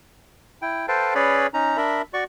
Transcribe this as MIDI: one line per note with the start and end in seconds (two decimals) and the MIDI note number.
0.62 0.86 64
0.62 0.86 79
0.88 1.14 69
0.88 1.14 71
0.88 1.14 72
0.88 1.14 77
0.88 1.14 79
0.88 1.14 81
1.15 1.47 61
1.15 1.47 68
1.15 1.47 71
1.15 1.47 73
1.15 1.47 74
1.15 1.47 83
1.54 1.77 61
1.54 1.77 63
1.54 1.77 82
1.77 2.02 62
1.77 2.02 70
1.77 2.02 76
1.77 2.02 83
2.14 2.24 66
2.14 2.24 74
2.14 2.24 85